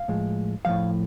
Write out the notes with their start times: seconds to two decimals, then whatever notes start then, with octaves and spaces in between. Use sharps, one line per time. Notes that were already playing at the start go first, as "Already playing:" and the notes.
Already playing: F5
0.08 A2 F3 G#3
0.65 A2 F3 G#3 F5